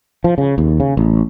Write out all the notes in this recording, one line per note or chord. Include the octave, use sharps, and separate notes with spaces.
F3
C#3
D#2
C#3
A1